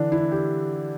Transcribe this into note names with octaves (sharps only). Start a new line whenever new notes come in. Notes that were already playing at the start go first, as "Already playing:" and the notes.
Already playing: D3 E3 D4
E4
G4